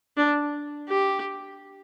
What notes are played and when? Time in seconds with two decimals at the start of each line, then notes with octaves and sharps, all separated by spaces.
0.17 D4
0.88 G4